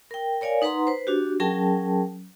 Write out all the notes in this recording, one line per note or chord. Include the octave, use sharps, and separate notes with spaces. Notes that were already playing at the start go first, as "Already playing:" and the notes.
A#4 G5
A#4 C#5 D5 F5 G#5
D#4 B4 F#5 A#5 C6
B4 C5
D4 F#4 G4
F#3 C#4 G#4 A#4 G5 A5